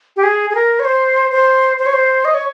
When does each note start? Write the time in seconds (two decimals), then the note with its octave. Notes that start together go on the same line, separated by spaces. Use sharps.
0.16 G4
0.23 G#4
0.50 G#4
0.55 A#4
0.79 C#5
0.85 C5
1.31 C5
1.79 C5
1.86 C#5
1.93 C5
2.25 D#5
2.34 C#5